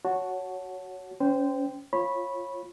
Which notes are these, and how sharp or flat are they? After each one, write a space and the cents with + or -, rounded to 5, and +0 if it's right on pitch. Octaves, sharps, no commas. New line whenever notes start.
F#4 -5 C#5 +0 A5 +0
C#4 +20 C5 -25 G5 +0
F4 +0 C#5 -25 B5 -10